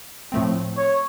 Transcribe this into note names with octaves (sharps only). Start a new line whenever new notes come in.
A2 F3 A3 C4
C#5